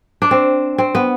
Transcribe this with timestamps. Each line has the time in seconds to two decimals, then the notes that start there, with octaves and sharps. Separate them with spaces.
0.22 D4
0.31 C4
0.78 C4
0.95 B3